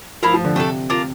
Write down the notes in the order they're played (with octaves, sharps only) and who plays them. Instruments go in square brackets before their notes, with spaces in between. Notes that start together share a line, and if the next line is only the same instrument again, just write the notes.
[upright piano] F3 [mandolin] E4 A#4 F5
[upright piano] F3
D3
[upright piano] C3 [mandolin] A3 D4 A4
[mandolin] D4 F4 A#4